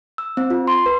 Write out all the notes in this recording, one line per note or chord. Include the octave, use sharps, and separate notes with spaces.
E6
C4
F4
C6
B4